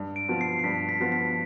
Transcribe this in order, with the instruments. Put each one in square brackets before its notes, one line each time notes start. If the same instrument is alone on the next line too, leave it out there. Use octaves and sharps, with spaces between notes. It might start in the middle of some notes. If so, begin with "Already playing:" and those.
Already playing: [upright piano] G2
[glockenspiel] D7
[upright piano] F3 B3
[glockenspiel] C7
C7
[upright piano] G2 [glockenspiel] B6
[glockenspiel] B6
[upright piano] F3 B3
[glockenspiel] B6